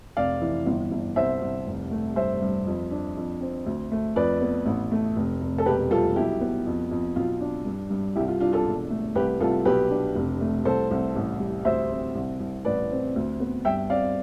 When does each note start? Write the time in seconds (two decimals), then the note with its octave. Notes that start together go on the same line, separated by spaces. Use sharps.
0.17 F1 D5 F5
0.42 E3
0.67 G1
0.92 G1
1.16 C2 C5 E5
1.41 C2
1.66 F1
1.91 A3
2.16 G2 C5 E5
2.42 G2
2.67 F2
2.91 D4
3.17 F2
3.41 C4
3.66 D2
3.92 A3
4.16 F2 B4 D5
4.41 B3
4.66 A1
4.92 A3
5.16 F1
5.42 F1
5.58 A4
5.66 E1 G4 B4
5.91 G3 F4 A4
6.16 B1 E4 G4
6.41 B3
6.66 F2
6.91 F2
7.16 B1 F4
7.41 D4
7.65 G2
7.90 G2
8.15 C2 E4 G4
8.28 F4
8.40 D4 F4
8.53 F4 A4
8.66 E1
8.90 A3
9.15 C2 G4 B4
9.40 C2 F4 A4
9.65 B1 G4 B4
9.90 D4
10.15 F1
10.41 A3
10.65 C2 A4 C5
10.91 C2
11.16 A1
11.40 G3
11.65 D2 C5 E5
11.91 C4
12.15 C2
12.40 C2
12.65 A1 B4 D5
12.91 C4
13.16 D2
13.40 B3
13.65 G2 E5 G5
13.90 C4 D5 F5